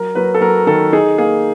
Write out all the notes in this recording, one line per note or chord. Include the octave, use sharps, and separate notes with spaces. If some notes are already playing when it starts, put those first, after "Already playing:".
Already playing: F#3 A#4
F#3 B4
A4
F#3 A#4
D#3 A4
D#4 G#4
A#3 G#4